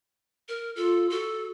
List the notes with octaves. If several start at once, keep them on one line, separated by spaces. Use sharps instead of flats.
A#4
F4 A4
F#4 A4